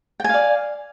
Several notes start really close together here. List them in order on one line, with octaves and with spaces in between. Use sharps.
G5 G#5 F5 D5